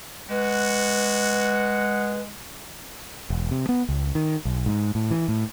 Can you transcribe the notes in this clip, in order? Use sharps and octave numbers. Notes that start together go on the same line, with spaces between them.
G#3 F#4 B4 F#5
E1
C3
B3
C#2
D#3
B1
G#2
A2
E3
A2